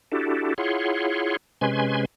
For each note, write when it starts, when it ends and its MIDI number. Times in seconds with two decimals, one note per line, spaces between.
0.12 0.54 62
0.12 0.54 64
0.12 0.54 66
0.12 0.54 67
0.12 0.54 69
0.58 1.37 64
0.58 1.37 65
0.58 1.37 68
0.58 1.37 73
0.58 1.37 78
0.58 1.37 84
1.61 2.05 48
1.61 2.05 56
1.61 2.05 61
1.61 2.05 71
1.61 2.05 80
1.61 2.05 84